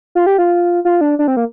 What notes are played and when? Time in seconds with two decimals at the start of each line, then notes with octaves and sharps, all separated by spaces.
0.15 F4
0.26 G4
0.38 F4
0.85 F4
1.01 D4
1.19 D4
1.28 C4
1.37 A#3